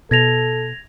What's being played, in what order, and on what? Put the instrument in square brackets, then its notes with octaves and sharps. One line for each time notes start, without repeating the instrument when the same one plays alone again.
[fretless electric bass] B2 [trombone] A4 [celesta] G#6 A#6 F7